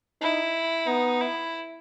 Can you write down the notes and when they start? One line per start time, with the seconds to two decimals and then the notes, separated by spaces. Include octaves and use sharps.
0.21 D#4 E4
0.87 B3 D#4
1.21 E4